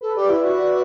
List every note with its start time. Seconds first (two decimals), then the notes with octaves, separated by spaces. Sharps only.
0.01 A4 B4
0.16 G4 D5
0.30 E4 E5
0.44 F#4 E5
0.58 E5
0.67 D5